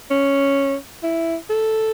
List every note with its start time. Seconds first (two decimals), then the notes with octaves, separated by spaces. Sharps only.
0.11 C#4
1.03 E4
1.50 A4